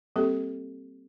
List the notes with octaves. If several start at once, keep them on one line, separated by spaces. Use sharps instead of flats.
G3 A#3 C4 G4 A4